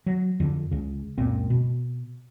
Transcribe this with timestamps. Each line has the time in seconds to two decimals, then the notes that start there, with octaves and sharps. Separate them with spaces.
0.06 F#3
0.40 F2 D3
0.71 C#2 C#3
1.18 C#2 F#2 A#2 C4
1.50 B2